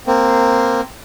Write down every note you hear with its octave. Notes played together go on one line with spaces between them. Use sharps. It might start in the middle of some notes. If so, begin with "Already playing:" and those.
A#3 C4